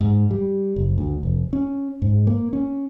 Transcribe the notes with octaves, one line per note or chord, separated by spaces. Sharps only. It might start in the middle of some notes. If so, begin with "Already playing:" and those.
G#2
G3
F#1
D2
F1
C#4
G#2
A#3
C#4